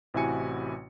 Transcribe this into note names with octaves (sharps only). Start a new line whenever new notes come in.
A1 C3 E4 F#4 G#5 C#7